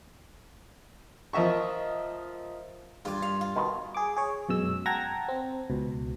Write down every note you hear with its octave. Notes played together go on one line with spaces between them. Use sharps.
F3 A#4 D#5 E5 C#6
G2 F4 D6
F5
F4
B2 D#3
G#4 D6
G#4 C#5
F#2 B2 G#3 E6
F#5 G5 A5 A#5 G#6 A#6
C4
C#2 B2